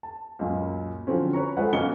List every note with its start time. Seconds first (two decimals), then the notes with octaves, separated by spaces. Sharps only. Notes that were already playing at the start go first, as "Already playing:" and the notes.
0.03 A5
0.39 C#2 F#2 A#2
1.07 D3 F3 F#3 C4 C#4
1.33 B4 C#5 A#5 C#6
1.57 G#3 F4 A4 B4 C5 F#5
1.73 B1 A#2 C#3 F#4 C#7 G7